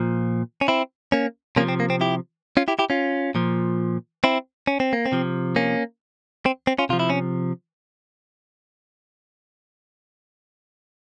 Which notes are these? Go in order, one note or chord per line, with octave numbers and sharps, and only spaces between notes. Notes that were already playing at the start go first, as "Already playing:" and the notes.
Already playing: A#2 F3
C#4
C4 E4
A#3 C#4
C3 F3 A#3 C#4
C4
A#3
C4
E4 G4
C#4 F4
E4 G4
E4 G4
C#4 F4
A#2 F3
C4 E4
C#4
C4
A#3
C4
C3 F3
A#3 C#4
C4
C4
C#4 F4
C3 F3 F4
E4
C#4